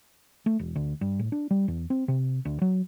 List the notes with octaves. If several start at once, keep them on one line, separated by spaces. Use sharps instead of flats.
A3
E1
D2
G2
A2
D4
G3
E2
C4
C3
D2
F#3